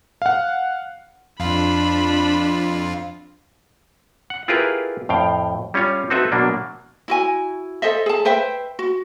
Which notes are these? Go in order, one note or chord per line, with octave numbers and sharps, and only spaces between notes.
F5 F#5
F2 D4 F4 B5
F#5
E4 F4 G4 G#4 A#4 B4
F2 A2 F5 G5
G3 C#4 F4 C#5
C4 D#4 F#4 A4 B4 E5
B2 F#3 A#3 D4
E4 F#4 G#5
A4 C5 D#5 E5
G#4 A5
B4 C5 E5 G5
F#4